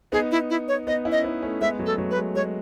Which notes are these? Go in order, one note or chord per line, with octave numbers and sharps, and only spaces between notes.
B3 D#4 G#4
E4
E4
C#5
B3 D#4 D#5
C#4 E4
D#5
B3 D#4
A3 C#4
G#3 B3 E5
F#3 A3
A4
F#3 A3
B4
G#3
G#3 C#5